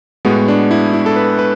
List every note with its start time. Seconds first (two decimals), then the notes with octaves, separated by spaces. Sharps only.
0.25 A2 G#3 B3 F#4
0.48 D4
0.71 E4
0.93 E4
1.06 A4
1.16 B4
1.39 B4